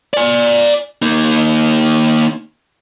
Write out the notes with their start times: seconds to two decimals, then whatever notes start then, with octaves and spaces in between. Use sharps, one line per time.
0.14 D5 G#5
1.02 A#3 D#4